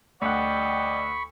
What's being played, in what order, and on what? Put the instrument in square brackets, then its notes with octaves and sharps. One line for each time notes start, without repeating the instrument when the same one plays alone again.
[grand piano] D2 F#5 [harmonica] D5 D#5 G5 [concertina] B5 C#6